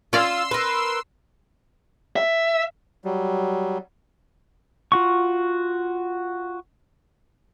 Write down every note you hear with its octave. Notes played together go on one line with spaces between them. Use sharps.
C#4 F4 D5 F5 C6 E6
A#4 B4
E5
F#3 G3
F4 F#4 C#6